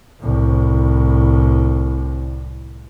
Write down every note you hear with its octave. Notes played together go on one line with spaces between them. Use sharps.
C2 A2